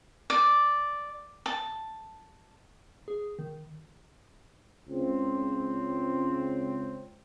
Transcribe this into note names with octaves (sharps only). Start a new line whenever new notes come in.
D5
A5
G#4
D#3
C#2 C4